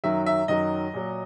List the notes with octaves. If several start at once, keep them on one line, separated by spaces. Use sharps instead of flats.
F#2 D#3 F#3 E5
E5
F#2 D#3 F#3 D#5
A#2 F#3